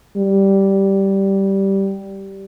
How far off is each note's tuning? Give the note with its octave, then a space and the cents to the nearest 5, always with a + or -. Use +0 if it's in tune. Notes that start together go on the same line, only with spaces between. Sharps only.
G3 -10